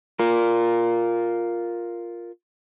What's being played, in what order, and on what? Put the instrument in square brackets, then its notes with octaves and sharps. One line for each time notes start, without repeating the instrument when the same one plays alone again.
[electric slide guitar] F4 A#4